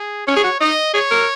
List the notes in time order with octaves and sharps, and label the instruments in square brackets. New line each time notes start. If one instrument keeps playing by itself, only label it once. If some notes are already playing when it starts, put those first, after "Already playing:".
Already playing: [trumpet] G#4
[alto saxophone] C#4 [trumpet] C#5
[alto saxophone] G#4
F#4
[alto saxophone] D#4 [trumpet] D#5
[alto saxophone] G#4 [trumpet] C#5
[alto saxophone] A#4